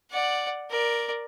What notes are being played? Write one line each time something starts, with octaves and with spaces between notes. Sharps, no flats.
D5 F#5
A#4 D5